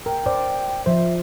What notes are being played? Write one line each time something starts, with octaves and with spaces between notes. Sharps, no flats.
A#4 G5
C5 D5
F3 C5 E5